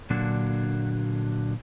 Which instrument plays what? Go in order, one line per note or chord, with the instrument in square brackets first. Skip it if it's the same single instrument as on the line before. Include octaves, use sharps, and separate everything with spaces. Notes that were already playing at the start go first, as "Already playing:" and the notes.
[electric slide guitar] A#2 D3 F#3 A#3 D4 F#4